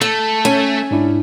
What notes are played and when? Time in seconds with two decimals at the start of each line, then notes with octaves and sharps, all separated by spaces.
0.01 A3 A4
0.45 C#4 G#5
0.91 G#2 D4 E4